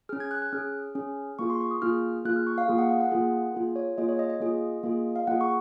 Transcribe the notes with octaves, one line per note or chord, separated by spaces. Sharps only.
C#4 G#4 F6
G#6
F#6
F#6
C#4 G#4 F6
C#4 G#4
A#3 F4 G#4 C#6
C6
C#6
D#6
A#3 F4 G#4 F6
A#3 F4 G#4 F#6
F6
C#6
F5
A#3 F4 G#4
F#5
F5
F#5
A#3 F4 G#4
A#3 F4 G#4
C#5
A#3 F4 G#4 D#5
C#5
D#5
D#5
A#3 F4 G#4
A#3 F4 G#4
F5
A#3 F4 G#4 F#5
C#6